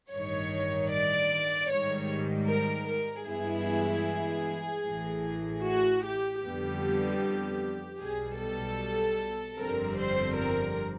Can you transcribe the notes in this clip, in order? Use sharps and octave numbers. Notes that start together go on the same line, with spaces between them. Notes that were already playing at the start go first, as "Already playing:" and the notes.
A1 G2 D#3 C#5
D5
G#2 D#3 G3 C#5
A#4
A#4
G2 E3 G#3 B3 E4 G#4
A1 A2 E3
F#4
G4
F2 D3 G3 B3 G4
B1 B2 G3 G#4
A4
G1 F2 D3 G3 C4 A#4
C5
A#4